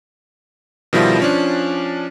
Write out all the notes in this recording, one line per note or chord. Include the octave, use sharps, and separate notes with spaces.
B2 D#3 F3 G3 E4 F4
F3 C#4 D4